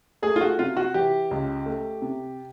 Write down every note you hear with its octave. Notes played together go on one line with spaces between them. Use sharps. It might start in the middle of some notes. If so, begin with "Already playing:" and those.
A3 G#4
F4
F#4
C3 F4
F#4
E3 G4
C#2
A3
C3